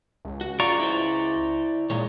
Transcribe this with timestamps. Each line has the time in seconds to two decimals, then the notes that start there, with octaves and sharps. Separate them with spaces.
0.25 C#2
0.41 F#4
0.60 F4 D5 A#5 C#6
0.80 E4 C5
1.90 A#2 D#3 G#3 C#5